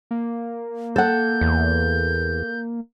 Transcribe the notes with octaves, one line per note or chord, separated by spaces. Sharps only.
A#3
A4 F#5 G6
E2